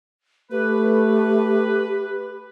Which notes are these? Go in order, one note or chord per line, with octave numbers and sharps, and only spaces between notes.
A3 G4 B4